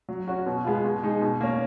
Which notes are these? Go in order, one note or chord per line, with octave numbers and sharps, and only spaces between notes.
F#3
C#4 F#4
B2
G#3 B3 F4
B2
G#3 D#4
B2
A#3 C#4